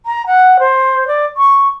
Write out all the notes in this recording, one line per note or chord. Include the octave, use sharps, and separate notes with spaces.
A#5
F#5
C5
D5
C#6